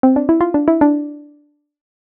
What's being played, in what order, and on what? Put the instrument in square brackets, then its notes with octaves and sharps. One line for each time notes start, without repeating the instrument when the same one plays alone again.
[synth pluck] C4
D4
E4
F4
D4
E4
D4